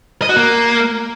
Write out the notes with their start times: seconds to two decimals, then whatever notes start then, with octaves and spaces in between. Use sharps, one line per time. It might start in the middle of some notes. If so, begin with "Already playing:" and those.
0.22 D#5
0.29 F#4
0.36 A#3